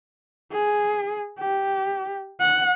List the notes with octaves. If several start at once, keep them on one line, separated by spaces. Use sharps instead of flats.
G#4
G4
F#5